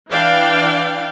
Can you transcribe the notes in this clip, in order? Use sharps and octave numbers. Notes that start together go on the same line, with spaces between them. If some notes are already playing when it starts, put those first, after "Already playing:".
E3 D4 D5 F5 G5